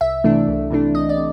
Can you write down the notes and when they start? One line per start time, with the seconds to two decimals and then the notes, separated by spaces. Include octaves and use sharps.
0.01 C2 E5
0.24 C3 E3 A3 D4
0.48 C2
0.70 C3 E3 A3 D4
0.94 C2 D#5
1.09 D5
1.17 C3